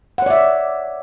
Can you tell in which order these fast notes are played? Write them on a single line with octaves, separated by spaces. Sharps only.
F#5 C#5 D5 E5